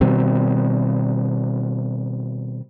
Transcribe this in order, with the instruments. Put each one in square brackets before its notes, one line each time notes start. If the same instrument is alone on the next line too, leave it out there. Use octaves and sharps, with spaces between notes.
[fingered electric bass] B2 D#3 G3 C4